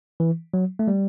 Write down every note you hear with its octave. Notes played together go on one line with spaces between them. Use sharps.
E3
F#3
A3
G3